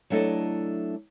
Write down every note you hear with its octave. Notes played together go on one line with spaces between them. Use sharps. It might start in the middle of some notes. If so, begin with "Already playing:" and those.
F#3 A3 D4 E4 A4 D#5